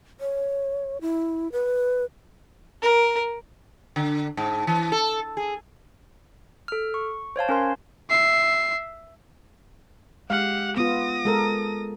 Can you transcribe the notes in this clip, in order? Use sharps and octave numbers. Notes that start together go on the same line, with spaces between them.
C#5
E4
B4
A#4
D3
G#2
E3
A4
G#4
A4 F6
C#6
C5 C#5 F5 A5
C#4 A#4 C6
E5 C7
G#3 G4 F5 F#5
B3 F4 D#6 A#6
G#3 A4 A#4